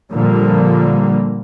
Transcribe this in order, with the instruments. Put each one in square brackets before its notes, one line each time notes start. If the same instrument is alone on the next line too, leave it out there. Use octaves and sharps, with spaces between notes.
[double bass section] A#2 D3 F3 G3 A#3